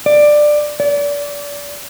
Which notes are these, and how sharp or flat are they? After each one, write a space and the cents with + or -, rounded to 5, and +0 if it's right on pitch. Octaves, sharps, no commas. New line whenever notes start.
D5 +15
D5 -30